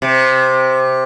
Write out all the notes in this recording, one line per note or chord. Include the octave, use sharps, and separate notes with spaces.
C3